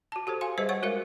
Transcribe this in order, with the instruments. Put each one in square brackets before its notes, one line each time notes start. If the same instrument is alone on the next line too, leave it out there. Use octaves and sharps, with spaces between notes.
[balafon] F#4 A5
F#4 G4 A4 C5
F5 G#5 C6
G3 G#4 B4 C5 D#5 F5
C#5 F#5 C#6
G#3 F#4 A#4 E5 F5